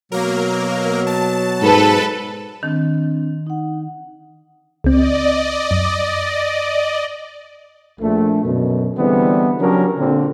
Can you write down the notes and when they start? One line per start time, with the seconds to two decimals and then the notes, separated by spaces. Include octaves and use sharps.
0.12 B2 F#3 A#3 A#4
1.07 A5
1.62 G#2 A4 B4
2.63 D#3 C4 D4
3.47 D#4 F#5
4.84 C#2 C4 D5 D#5
5.71 F#2
8.01 A#1 A3
8.44 F#2 B2 D3
8.96 D3 E3 G3 G#3 B3 C4
9.59 C#3 F#3 C#4 D4 G4 A#4
9.98 A#2 D3 C4